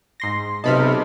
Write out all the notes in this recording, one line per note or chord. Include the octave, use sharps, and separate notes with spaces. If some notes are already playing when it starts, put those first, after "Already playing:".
G#2 C6 A#6
B1 C3 D#5 A5 B5 F6